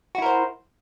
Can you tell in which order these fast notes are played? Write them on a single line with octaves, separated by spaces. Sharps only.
F#4 E4 A#4 C5